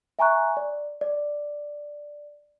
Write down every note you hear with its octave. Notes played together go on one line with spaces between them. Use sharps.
E5 G#5 A#5 C#6 F#6
D5
D5